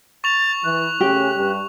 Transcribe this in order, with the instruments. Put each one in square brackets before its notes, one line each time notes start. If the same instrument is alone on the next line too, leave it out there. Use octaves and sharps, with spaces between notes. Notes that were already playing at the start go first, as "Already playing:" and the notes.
[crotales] C#6 F7 [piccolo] A6
[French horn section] E3 [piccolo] F#6
[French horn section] C#3 A3 C#4 [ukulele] G4
[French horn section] G2